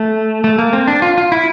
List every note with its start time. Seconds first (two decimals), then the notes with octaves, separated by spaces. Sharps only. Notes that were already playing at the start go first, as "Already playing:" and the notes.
Already playing: A3
0.44 A3
0.58 A#3
0.73 C4
0.88 D4
1.02 F4
1.18 F4
1.32 E4